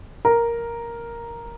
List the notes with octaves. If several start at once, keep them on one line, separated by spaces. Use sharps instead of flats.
A#4